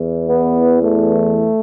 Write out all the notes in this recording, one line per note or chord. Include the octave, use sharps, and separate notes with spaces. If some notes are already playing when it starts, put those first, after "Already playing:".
Already playing: E2 E3
B3
A3